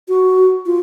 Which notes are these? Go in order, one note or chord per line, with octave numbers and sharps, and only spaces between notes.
F#4
F4